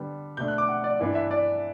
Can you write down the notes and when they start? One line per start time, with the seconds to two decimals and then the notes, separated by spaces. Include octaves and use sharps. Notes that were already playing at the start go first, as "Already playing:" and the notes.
Already playing: D3 G3 B3
0.37 B2 A3 D4 G6
0.48 F#6
0.58 D6
0.68 F#5
0.84 D5
0.99 G2 E3 B3 D4 D5
1.15 E5
1.31 D5